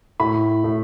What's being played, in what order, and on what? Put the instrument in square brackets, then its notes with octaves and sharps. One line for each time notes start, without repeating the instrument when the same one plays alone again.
[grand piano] A2 B5
A2